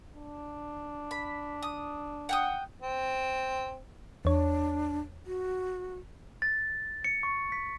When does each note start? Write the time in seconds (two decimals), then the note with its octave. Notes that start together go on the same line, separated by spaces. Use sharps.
0.16 D4
1.11 B5
1.63 D#6
2.29 F#5 G5 D#6
2.81 C4
4.25 E2 D4 C#5
5.26 F#4
6.42 A6
7.04 C#7
7.23 C#6
7.52 B6